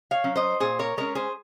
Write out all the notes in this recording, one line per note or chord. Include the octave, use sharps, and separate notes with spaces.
C#5 F5
F#3 C#4
C5 D#5
A#2 G#4 C5
A#4 C#5
G#3 C#4 A#4 C#5
G#4 C5